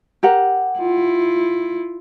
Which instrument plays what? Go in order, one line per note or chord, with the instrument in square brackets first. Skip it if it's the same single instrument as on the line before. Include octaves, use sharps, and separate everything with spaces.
[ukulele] G4 A#4 F#5
[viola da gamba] E4 F4